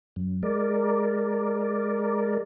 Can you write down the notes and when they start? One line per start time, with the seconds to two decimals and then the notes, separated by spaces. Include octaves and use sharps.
0.16 F#2
0.43 G#3 A#4 D5